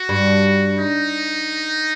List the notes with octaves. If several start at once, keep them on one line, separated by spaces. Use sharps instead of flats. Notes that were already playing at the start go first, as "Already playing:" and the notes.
Already playing: F#4
G2
D#4